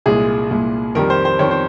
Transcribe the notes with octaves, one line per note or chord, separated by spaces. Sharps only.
C2 A#2 G#3 G#4
C2 A#2 G#3
F2 D#3 G3 A#4
C5
C5
F2 D#3 G3 C#5
C5